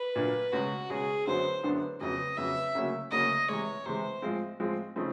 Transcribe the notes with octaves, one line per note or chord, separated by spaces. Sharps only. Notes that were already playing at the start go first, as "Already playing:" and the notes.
Already playing: B4
A#2 F#3 A#3 D4
C#2 B2 G#3 C#4 F#4
C#2 B2 G#3 C#4 G#4
F#2 D3 F#3 B3 D4 C5
F#2 D3 F#3 B3 D4
F2 C#3 F#3 B3 D#5
F2 C#3 F#3 B3 E5
D2 C#3 F#3 A#3 C#4
D2 C#3 F#3 A#3 C#4 D#5
C3 E3 G#3 C#5
C3 E3 G#3 C5
A2 F3 G#3 C4 F4
A2 F3 G#3 C4 F4
C#3 F3 A3 C4 D#4